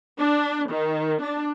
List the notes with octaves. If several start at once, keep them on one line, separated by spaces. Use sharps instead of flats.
D4
D#3
D4